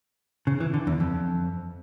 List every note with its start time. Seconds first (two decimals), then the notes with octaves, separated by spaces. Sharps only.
0.47 C#3
0.60 E3
0.74 D3
0.87 E2
1.00 F2